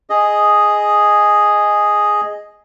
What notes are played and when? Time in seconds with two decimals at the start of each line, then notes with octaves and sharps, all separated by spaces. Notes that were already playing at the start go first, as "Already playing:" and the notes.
0.10 G#4 D#5